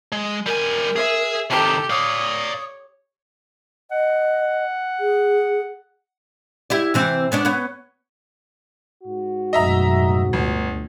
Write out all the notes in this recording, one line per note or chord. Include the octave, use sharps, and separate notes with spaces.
G#3
G3 A#4 G#5
G#4 E5
C3 D#3 G4 A4 A5
C#5 D5 F5 D#6
D#5 F#5
G#4
E4 G4 D5
C3 E3 C4
B3 C#4 D4
B3 C#4
G#2 F#4
A1 F#2 B2 D#5 E5 A#5
G1 D2